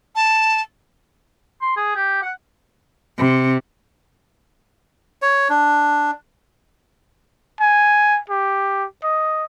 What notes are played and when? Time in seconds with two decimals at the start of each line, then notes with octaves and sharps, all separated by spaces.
0.15 A5
1.61 C6
1.77 G#4
1.95 G4
2.22 F#5
3.18 C3
5.22 C#5
5.50 D4
7.61 G#5
8.30 G4
9.03 D#5